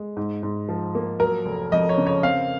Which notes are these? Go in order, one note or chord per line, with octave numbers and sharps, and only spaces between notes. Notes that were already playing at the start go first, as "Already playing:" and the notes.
Already playing: G#3
G#2
G#2
F3
A#3
F#3 A#4
F1
F2 D#5
C#5
C#3
C#5
C4 F5